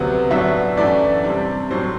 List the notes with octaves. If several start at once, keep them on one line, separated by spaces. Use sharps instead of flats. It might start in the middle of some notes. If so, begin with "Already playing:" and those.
Already playing: D2 C3 F#3 B3
A2 F#3 B3 D4 E5
F#2 E3 A3 D4 D5
C3 G3 D4
A2 F#3 C4 C5